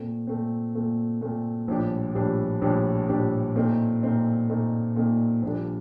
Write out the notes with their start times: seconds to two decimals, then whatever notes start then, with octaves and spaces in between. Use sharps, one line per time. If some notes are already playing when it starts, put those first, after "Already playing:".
Already playing: A#2 A3 C4
0.27 A#2 A3 C4
0.75 A#2 A3 C4
1.21 A#2 A3 C4
1.68 A#1 A2 G3 D4 G4
2.15 A#1 A2 G3 D4 G4
2.61 A#1 A2 G3 D4 G4
3.08 A#1 A2 G3 D4 G4
3.56 A#2 A3 C4 D#4
4.03 A#2 A3 C4 D#4
4.49 A#2 A3 C4 D#4
4.96 A#2 A3 C4 D#4
5.43 A#1 A#2 G3 D4 A4